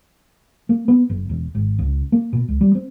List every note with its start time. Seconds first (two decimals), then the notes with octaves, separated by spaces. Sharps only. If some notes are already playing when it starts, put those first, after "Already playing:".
0.69 A#3
0.88 B3
1.09 F#1
1.29 E1
1.55 G#1
1.79 C#2
2.12 A#3
2.33 B2
2.48 C#2
2.61 G3
2.75 C4